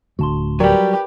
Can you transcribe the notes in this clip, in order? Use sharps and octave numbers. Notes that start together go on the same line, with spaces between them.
D1 D3 A3 F#4 A5 C6
F#3 G3 G4 A#4 B4 D5 G5